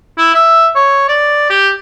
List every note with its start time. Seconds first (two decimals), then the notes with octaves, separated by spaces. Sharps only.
0.18 E4
0.34 E5
0.76 C#5
1.09 D5
1.50 G4